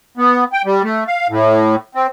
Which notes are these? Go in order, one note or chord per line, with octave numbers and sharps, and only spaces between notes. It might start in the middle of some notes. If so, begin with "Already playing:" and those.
B3
G5
G3
A3
F5
A2
C4